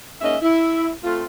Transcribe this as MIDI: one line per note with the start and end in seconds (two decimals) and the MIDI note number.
0.21 0.36 44
0.21 0.36 58
0.21 0.36 61
0.21 0.36 75
0.21 0.36 76
0.42 0.91 64
1.03 1.25 57
1.03 1.25 60
1.03 1.25 65